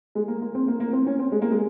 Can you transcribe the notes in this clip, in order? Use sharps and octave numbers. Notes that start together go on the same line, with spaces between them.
G#3
A#3
A#3
C4
A#3
A#3
C4
C#4
C4
G#3
A#3
G#3